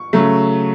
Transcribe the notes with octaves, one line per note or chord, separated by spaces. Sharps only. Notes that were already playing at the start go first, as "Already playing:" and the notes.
Already playing: C#6
C#3 F#3 A3